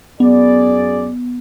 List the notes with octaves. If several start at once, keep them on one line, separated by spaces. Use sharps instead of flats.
F#2 B3 G#4 D5